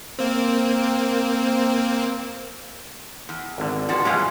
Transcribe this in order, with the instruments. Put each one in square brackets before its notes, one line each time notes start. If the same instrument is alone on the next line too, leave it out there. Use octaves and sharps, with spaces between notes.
[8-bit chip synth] A#3 C4
[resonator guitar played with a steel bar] E2
[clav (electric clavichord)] G#1 D3
[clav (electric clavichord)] C#2 A5 [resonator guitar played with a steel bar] F3 G#3 F#4
[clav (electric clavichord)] A1 B2 G#3 [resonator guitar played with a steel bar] G3 C#4 F4